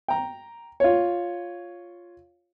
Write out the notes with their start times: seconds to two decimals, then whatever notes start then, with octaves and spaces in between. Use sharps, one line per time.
0.08 G5 A#5
0.80 F4 C#5